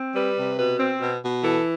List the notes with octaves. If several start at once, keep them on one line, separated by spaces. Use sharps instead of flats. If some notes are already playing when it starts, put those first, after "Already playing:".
Already playing: C4
G3 B4
C3
B2 B4
C4
B2
B2
E3 A4